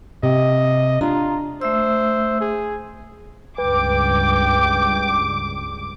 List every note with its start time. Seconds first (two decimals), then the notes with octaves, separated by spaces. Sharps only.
0.23 C3 D#5
1.01 D4 F4 A#5
1.61 A3 C5 E5 E6
2.41 G#4
3.58 C#2 G2 G3 B4 G5 D6